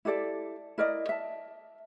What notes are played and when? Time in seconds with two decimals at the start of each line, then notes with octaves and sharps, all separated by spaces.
0.05 E4 G4 A4 D5
0.78 E4 A#4 D5 D#5
1.09 E5 A5